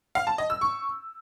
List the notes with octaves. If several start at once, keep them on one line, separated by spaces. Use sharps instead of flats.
F5
A5
D#5
E6
C#6